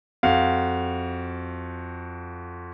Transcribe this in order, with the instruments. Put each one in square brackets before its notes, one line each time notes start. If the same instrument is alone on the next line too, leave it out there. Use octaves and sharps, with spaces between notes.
[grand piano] F2 F#4 F5